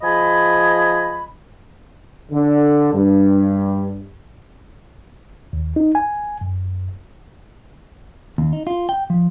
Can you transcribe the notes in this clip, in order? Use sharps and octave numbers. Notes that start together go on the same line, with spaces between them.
F3 G#4 D#5 G#5 B5
D3
G2
D#2
D#4
G#5
F#2
D#2
D#4
F4
G5
F3